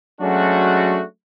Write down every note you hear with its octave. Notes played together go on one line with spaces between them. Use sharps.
F#3 G#3 A3 C#4 D4 F#4